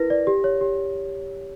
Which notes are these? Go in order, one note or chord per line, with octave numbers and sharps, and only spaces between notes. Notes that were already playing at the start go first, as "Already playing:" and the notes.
Already playing: E4 A#4 B4 A#6
D5
G4
C#5
G4